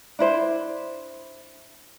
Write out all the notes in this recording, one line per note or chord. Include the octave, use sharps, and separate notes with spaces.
D4 E4 C5